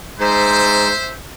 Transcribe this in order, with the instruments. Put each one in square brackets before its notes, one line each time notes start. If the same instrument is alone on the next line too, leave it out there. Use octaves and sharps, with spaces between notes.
[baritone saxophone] G#2 [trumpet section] C5 E5